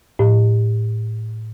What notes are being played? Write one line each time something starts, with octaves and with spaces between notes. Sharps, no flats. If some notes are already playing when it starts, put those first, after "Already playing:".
A2